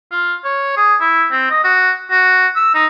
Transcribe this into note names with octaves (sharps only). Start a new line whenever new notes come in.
F4
C#5
G#4
E4
C4
D#5
F#4
F#4
E6
D#4